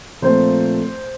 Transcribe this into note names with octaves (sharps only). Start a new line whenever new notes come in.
A#2 F3 A3 C4 C5